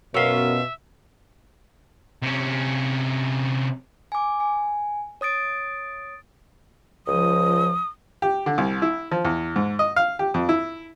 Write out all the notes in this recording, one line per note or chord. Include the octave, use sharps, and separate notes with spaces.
F#2 B2 C#4 F4 E5
C3 C#4
G#5 D6
G#5
C#5 D#6 A6 D7
C#2 F3 D#6
G4
D3
C2
E4
F3
E2
G#2
D#5
F5
G4
F2
E4